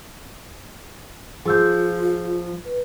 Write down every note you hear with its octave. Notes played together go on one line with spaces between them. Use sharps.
F3 F4 G#4 E6 G6
B4